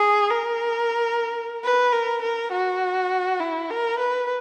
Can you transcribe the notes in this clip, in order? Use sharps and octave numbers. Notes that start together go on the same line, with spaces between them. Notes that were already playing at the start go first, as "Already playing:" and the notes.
Already playing: G#4
A#4
B4
A#4
A#4
F#4
E4
A#4
B4